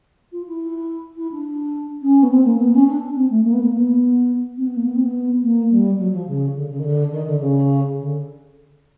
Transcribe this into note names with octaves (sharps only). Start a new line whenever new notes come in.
F4
E4
E4
D4
C#4
B3
C4
A#3
B3
C#4
D4
C4
A3
A#3
B3
A#3
B3
C4
B3
A#3
B3
C4
B3
A#3
G3
F#3
F3
C#3
D3
C#3
D#3
D3
D#3
D3
C#3
D3